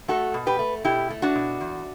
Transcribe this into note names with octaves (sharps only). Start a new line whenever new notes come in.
A3 F#4 A4
B2
G4 B4
A3
B2 E4 G4
A3
D4 F#4
B2
E2